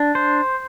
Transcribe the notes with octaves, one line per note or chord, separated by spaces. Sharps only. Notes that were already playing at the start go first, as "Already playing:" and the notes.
Already playing: D4
C5